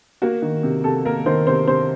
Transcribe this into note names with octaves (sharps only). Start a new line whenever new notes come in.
A#3 F#4
D#3
C3
C3 A4
A#3 A#4
D#3 C5
C3 C5
C3 C5